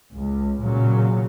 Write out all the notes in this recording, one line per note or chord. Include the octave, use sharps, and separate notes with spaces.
C#2
A#2 C#3 F#3